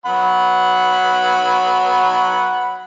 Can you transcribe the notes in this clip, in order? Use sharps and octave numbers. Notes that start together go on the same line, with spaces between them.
F#3 F#5 B5